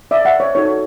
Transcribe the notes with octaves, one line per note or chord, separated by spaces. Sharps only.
D5 E5
E5 F#5
C#5
D#4 F#4 A4 C#5